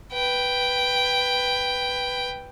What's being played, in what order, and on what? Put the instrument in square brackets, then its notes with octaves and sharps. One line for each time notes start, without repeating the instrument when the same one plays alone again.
[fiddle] B4 G5